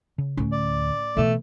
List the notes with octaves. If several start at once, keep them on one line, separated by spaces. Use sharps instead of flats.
C#3
D2 A2 C#4
D5
B2 E3 A3